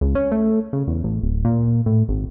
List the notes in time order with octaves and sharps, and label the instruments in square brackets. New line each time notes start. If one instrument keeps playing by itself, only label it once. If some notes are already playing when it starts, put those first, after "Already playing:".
[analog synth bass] C#2
C#4
A3
C#3
E2
A1
D1
A#2
A2
G#1